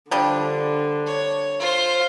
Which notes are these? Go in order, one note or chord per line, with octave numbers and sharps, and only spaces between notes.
D3 F3 G3 D4
C#5
F4 C5